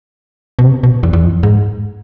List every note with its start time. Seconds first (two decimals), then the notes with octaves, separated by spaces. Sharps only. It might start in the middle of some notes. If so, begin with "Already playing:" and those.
0.59 B2
0.64 C3
0.83 B2
1.03 E2
1.13 E2
1.22 F2
1.43 G#2